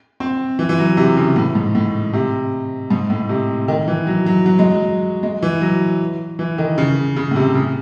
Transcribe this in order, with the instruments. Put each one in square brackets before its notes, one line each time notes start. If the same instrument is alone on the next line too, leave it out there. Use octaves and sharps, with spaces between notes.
[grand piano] C4
E3
E3
F#3
C3
C#3
A2
G#2
A2
C3
G#2
A2
C3
D#3
E3
F#3
F#3
F#3
G#3
F#3
G#3
E3
F#3
E3
D#3
C#3
C#3
A2
C3
C#3